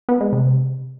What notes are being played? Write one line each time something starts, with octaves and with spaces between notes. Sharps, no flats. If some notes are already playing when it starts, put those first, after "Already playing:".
B3
G#3
C3